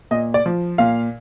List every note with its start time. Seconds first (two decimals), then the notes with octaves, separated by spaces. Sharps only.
0.11 A#2 D#5
0.34 D5
0.46 F3
0.78 A#2 F5